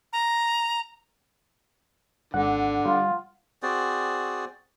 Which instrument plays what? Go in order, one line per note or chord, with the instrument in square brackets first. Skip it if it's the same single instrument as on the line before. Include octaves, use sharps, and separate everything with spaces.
[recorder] A#5
[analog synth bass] G#1 [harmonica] D3 [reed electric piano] F#5
[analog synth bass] G3 [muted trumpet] F4
[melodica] C4 F#4 G#4 D5